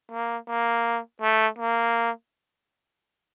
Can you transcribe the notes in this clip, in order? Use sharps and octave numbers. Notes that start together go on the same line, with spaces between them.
A#3
A#3
A3
A#3